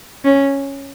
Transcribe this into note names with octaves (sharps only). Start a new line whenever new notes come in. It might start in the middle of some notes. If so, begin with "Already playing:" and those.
C#4